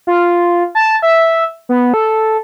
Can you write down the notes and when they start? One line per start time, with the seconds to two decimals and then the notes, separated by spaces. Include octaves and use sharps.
0.07 F4
0.75 A5
1.02 E5
1.69 B3
1.94 A4